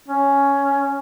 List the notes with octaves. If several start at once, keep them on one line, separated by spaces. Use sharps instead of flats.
C#4